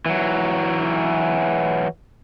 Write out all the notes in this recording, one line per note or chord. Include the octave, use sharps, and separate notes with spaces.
E3 F#3